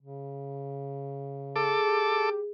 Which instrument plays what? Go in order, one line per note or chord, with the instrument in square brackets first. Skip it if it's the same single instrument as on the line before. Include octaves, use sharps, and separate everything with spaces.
[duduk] C#3
[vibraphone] G#4 [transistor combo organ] A4 D6
[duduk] G4